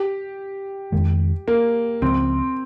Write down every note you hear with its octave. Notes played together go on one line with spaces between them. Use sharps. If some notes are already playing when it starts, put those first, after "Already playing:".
Already playing: G4
F2 D#3 G#3
A#3
C#2 C#3 F3 C4